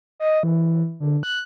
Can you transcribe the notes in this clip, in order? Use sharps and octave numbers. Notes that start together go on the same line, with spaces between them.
D#5
E3
D3
F#6